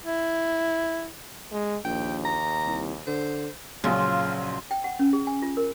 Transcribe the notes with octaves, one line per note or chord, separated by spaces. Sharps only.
E4
G#3
A#1 D#2 G5
A#5
C2
D3 C5
A#1 C#3 F3 F#3 G#3 F4
G5
F#5
C#4
G#4
G#5
F4
A#4